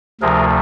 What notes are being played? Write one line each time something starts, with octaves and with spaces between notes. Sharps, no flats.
D2 C3 F3 A3 G#4 A#4